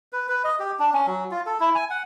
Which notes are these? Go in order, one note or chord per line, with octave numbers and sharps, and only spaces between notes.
B4
B4
D#5
G4
D4
C#4
F#3
F4
A4
E4
G#5
F#5